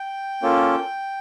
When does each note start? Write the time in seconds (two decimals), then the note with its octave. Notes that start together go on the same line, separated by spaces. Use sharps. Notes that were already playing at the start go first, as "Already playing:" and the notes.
Already playing: G5
0.42 A#3 C#4 F4 A4